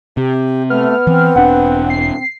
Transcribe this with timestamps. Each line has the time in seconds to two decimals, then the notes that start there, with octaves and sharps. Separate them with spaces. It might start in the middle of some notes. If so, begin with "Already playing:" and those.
0.17 C3 G4
0.70 A3 B3 F6
1.07 E3 C4
1.36 E1 D4 F#5
1.90 C7